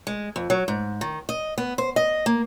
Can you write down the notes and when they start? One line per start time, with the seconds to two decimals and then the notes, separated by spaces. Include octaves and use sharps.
0.07 G#3
0.36 F2
0.50 F#3
0.68 G#2
1.01 D#3
1.29 D#5
1.58 B3
1.78 C5
1.96 D#5
2.26 A#3